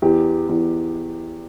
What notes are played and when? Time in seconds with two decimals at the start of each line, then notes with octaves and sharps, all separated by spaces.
0.02 E2 G4
0.49 E2